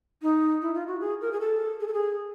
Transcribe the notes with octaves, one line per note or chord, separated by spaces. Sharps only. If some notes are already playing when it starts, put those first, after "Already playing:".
D#4
E4
F4
F#4
G#4
A#4
G#4
A4
G#4
A4
G#4